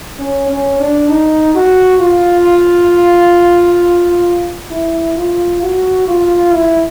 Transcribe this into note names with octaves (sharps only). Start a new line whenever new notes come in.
C#4
C#4
D4
D#4
F#4
F4
E4
F4
F#4
F4
E4